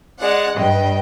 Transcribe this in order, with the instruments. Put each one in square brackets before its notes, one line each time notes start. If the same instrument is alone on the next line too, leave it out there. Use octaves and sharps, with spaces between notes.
[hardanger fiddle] G#3 D5 [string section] F#5
[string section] G2 B4 [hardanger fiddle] D#5 G5